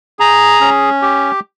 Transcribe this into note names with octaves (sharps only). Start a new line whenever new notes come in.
G#4 A#5
C#4
G4